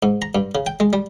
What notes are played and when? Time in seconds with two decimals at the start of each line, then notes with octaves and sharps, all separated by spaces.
0.03 G#2
0.22 A#5
0.35 G2
0.55 C#3
0.66 G5
0.80 G#3
0.93 G3